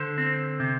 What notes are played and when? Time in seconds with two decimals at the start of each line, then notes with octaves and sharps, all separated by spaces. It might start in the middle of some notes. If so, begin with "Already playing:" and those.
Already playing: D3 A4 C5
0.18 C4
0.60 C3